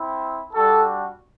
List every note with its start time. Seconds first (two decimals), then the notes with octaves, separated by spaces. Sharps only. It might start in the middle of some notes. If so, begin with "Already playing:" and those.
Already playing: C4 E4
0.53 G3 D4 F#4 A4